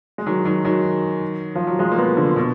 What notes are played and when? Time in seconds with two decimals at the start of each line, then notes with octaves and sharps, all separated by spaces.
0.18 G#3
0.26 D#3 F#3
0.45 D#3 F#3
0.65 D#3 F#3
1.55 F3
1.67 F#3
1.79 F3 G#3
1.91 A#3
1.98 G#3 B3
2.16 D3 F3
2.36 B2